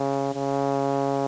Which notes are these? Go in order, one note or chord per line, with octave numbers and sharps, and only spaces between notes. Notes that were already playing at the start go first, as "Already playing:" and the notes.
Already playing: C#3
C#3